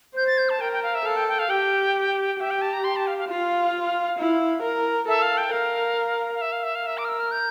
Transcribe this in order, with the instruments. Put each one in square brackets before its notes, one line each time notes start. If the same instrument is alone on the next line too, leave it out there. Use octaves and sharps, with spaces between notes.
[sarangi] C5 [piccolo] G6
[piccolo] A6
G6
A5
[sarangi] A#4 [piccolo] G5
[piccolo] G5
F5
E5
[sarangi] A4 [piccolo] F5
[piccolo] G5
G5
F5
[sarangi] G4 [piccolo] G5
[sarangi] G4 [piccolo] E5
[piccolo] G5
A5
A#5
C6
A5
F5
F5
[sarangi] F4 [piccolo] F5
[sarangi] E4
A#4
[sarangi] A4 [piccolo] E5
[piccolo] F5
G5
[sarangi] A#4 [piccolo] F5
[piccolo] F5
E5
F5
E5
F5
[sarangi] A#4 [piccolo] E5
[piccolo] D6
F6
E6
F6
G6